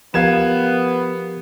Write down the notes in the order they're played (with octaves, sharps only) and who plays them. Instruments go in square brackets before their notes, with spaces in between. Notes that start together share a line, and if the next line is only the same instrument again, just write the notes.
[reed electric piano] F3 G4 A#4 [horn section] B3 [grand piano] F5 G#6 E7